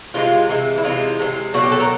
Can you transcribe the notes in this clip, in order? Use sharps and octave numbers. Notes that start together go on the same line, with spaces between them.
C3 E3 G#3 F4
C3 E3 G#3
E4
C3 E3 G#3 F4
C3 E3 G#3
B2 F#3 A3 F#4
G4
A4
A#4